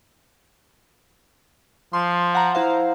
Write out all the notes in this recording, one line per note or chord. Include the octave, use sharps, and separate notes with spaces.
F3 C6
F#5 A#5
E4 C5 F5